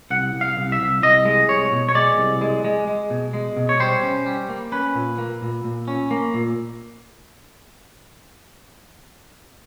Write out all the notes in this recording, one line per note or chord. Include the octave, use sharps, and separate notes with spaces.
C2 F#5
C2
F5
C2
E5
C2
C2 D#5
G#3
C2 C#5
B2
C#5
G#3 D5
C2
G#3
G#3
G#3
B2
G#3
B2
C#5
G3 C5
C#4
G3
A#3
C#4 B4
A#2
A#3
A#2
A#2
C#4
A#3
A#2